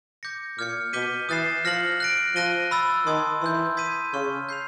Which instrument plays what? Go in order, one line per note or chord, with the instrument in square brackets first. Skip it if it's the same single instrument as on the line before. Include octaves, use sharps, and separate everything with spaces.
[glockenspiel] D6 G6 A#6 C#7
[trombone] A#2 [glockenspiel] D6 F6 G#6 C#7
[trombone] B2 [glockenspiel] D6 G6 B6 D#7 G7
[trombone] E3 [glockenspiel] D#6 F#6 A6 C7 E7
[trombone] F3 [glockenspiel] F6 A#6 C#7 F#7
[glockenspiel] F#6 A#6 D7
[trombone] F3 [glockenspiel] F#6 A#6 D#7 G7
[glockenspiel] B5 E6 A6
[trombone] D#3 [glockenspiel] A5 C6 D#6 G#6
[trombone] E3 [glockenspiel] C6 E6 G6
[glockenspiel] C6 D#6 G#6 B6 D#7
[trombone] C#3 [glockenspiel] C#6 F6 G#6
[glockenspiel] G6 C7 F7